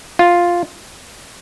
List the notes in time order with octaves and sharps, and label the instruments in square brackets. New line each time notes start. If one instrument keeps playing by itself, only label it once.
[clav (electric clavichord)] F4